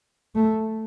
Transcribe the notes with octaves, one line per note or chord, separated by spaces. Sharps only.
A3